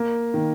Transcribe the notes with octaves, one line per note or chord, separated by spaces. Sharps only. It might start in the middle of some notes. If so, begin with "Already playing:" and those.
Already playing: A#3
D#3